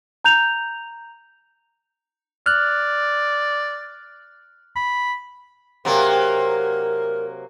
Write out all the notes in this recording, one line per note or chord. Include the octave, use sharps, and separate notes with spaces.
A#5 G6 F7
D5 F6 F#6
B5
C3 F#3 A#3 A#4